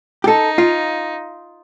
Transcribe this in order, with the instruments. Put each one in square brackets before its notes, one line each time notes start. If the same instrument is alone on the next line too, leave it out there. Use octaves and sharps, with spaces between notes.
[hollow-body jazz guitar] G4
[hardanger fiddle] D#4 [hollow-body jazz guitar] A4
[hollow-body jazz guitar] F4